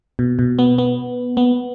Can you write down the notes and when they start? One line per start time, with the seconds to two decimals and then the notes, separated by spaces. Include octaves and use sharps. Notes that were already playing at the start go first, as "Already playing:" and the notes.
0.19 B2
0.39 B2
0.59 B3
0.78 B3
1.37 B3